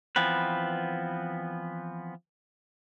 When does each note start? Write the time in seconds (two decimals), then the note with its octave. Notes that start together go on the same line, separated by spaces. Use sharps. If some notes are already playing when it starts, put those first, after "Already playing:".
0.16 E3 F3 B3 C4 B4